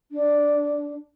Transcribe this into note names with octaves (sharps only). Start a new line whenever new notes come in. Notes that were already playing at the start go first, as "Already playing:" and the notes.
D4